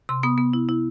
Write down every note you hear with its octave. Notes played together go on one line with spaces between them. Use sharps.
C3 C6
B3 D#6
B3
E4
E4